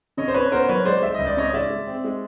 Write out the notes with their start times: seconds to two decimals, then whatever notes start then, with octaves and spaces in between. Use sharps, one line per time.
0.17 C#3 C#5 D#5
0.28 C5
0.34 C#3 B4 C#5
0.52 B3 A#4 C5
0.69 F#3 B4 C#5
0.85 G#3 C5 D5
1.02 G#3 E5
1.15 C#2 D#5
1.27 D5
1.37 C#4 C#5 D#5
1.53 G#3 D5 E5
1.70 G#3
1.87 C4
2.04 G#3